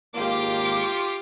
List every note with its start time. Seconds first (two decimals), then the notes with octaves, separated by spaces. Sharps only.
0.15 G#1 A#3 F4 G4 D6